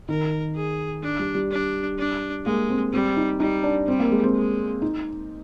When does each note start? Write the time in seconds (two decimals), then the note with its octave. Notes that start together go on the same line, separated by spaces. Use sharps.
0.09 D#3 A#4
0.56 G#4
1.03 D4
1.19 G3
1.35 G3
1.51 D4
1.99 D4
2.45 G#3 A#3
2.69 C4
2.93 G3 C4
3.17 D#4
3.40 G3 D#4
3.63 D4
3.87 G3 C4
4.00 A#3
4.12 G#3
4.24 C4
4.35 G#3
4.82 D#4